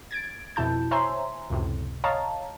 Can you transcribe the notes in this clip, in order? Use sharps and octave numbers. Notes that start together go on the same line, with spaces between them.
G#6 A6 D7
F2 B2 E4 A5 G6
C5 C#5 E5 G#5 A#5 C6
C#2 F#2 A2 C3
C#5 D#5 F5 A5 A#5